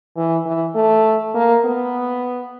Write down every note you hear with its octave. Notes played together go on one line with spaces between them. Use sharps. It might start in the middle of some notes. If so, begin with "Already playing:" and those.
E3
E3
A3
A#3
B3